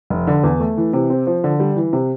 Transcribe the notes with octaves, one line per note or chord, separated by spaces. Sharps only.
F1
D3
E2
A3
E3
C3
C4
F3
D3
G3
E3
C3